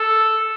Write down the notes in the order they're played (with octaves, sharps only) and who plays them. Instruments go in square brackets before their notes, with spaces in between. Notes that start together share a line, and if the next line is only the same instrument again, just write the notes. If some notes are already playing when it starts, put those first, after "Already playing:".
Already playing: [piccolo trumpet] A4